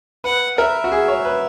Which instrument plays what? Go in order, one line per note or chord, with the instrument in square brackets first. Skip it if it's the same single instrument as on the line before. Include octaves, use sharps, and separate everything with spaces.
[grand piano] B4 [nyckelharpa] F#5
[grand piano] A#4 [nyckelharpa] E5
[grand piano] F#4
G#4
C#5
B4